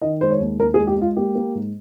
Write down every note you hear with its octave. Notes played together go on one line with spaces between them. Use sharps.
D#3 D#5
G#3 C5
C#5
D#2
D#2 A#4
G#4
G#3
G4
G#3 F4
A#3 G4
A#3
G#2